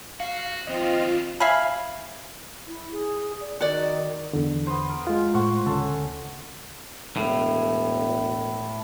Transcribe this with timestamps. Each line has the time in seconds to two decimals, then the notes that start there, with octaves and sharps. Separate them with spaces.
0.20 F#4 F5
0.67 D#2 F3 C4 F4 D#5
1.40 E5 F5 G#5 B5
2.67 E4
2.91 G#4
3.41 D5
3.61 D#3 F#4 D5
4.33 E2 D3
4.67 B3 B4 C5
4.89 A#4
5.07 G#3 F4
5.34 A2 C5 F#5 C#6
5.66 D2 C#3 C#4 A4
7.16 E1 A2